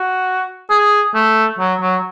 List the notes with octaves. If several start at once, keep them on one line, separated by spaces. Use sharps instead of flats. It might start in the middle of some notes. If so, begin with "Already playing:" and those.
Already playing: F#4
G#4
A3
F#3
F#3